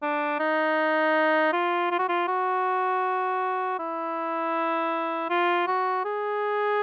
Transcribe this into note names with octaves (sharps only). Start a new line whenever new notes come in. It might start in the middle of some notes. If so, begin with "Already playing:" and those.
D4
D#4
F4
F4
F#4
F4
F#4
E4
F4
F#4
G#4